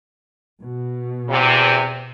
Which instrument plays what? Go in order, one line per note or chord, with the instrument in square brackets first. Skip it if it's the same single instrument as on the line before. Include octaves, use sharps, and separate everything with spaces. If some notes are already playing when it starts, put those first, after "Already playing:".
[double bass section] B2
[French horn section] E2 C3